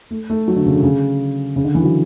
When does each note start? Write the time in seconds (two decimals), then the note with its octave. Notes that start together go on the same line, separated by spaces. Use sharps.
0.11 A3
0.30 A3
0.48 F#3
0.56 D3
0.66 C#3
0.74 D3
0.83 C#3
1.56 C#3
1.64 D3
1.75 E3
1.83 F#3